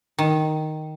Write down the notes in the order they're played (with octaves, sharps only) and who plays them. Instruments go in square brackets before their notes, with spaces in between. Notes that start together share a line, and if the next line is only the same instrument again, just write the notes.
[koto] D#3